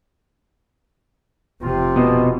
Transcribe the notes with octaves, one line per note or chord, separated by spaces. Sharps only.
F1 C3 F4
B2